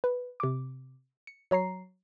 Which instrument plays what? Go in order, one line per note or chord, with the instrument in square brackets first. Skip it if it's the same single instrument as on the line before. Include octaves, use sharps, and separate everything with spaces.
[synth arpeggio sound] B4
C3 D6
C#7
F#3 C#5 A#5 C7